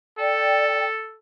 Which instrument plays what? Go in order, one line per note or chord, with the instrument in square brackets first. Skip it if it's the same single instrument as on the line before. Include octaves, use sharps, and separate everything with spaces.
[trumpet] A4 [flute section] D5 G5